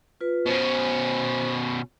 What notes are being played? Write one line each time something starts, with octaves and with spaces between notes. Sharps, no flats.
F4 B4
B2 C#4 C5